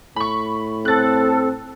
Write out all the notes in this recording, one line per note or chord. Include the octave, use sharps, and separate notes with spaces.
A2 B5 C#6
C4 A4 F#6 A6